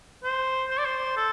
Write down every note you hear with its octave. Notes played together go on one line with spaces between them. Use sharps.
C5
C5
D5
C5
A4